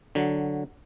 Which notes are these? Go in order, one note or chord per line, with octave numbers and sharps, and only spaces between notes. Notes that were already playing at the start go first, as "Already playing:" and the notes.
D3 F#3